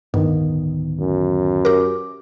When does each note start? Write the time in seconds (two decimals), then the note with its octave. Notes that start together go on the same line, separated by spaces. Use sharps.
0.14 D1 G2 D#3 B3
1.00 F#2
1.65 G4 A#4 D6